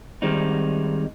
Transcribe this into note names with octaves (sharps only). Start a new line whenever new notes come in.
D#3 G3 G#3 C4 D#4